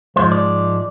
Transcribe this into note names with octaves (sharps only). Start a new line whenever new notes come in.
G#2 F3 G#3 C5
D5